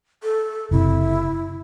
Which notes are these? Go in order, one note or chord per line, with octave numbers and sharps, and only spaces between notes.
A4
F#1 C3 E4